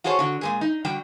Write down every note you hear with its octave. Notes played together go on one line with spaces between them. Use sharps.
F4 F#4 G#4 A4 C5 C#5
D3 F#4
A#2 G#3 G#4
D#4
D3 G3 F#4 G5